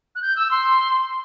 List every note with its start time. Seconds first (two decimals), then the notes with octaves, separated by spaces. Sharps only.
0.15 F#6
0.22 G6
0.36 E6
0.51 C6